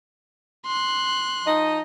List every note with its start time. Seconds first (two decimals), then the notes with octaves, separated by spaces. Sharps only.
0.66 C6 F#6
1.46 F3 D#4 D#5